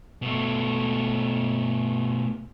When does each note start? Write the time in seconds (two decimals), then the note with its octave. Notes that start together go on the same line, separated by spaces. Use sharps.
0.22 B2 A3